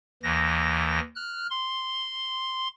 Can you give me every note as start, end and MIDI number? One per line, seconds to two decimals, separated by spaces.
0.23 1.00 39
0.23 1.00 52
0.23 1.00 94
1.16 1.47 89
1.16 1.47 90
1.50 2.68 84